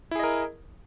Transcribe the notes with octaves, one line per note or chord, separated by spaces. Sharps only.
E4 G#4 A#4 D#5